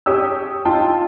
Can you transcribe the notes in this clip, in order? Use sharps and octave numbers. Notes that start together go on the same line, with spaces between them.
G4 C#5 D#6 E6
D#4 F4 G5 A5